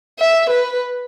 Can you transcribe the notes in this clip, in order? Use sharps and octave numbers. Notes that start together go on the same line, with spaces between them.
E5
B4